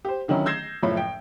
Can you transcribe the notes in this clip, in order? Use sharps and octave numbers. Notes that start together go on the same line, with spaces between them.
G4 C5
D3 D#3 F#3 C#4 E4
E6 G6 G#6 A#6 C7 E7
F#1 A2 F3 C#5 B5
G5